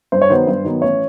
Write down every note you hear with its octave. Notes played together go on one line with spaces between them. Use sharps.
G2 C5
C#5
D#3 F#3 B3 C5
G2
D#3 F#3 B3
A1 C#5